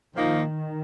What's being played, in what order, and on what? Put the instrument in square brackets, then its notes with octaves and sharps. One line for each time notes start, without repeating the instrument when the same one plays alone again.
[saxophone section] A#2 F3 A#3 D#4 [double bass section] D#3